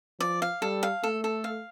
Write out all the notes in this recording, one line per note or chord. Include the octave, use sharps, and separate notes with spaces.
F3 D5
F5
G3 A4
F5
A3 A4
A4
F5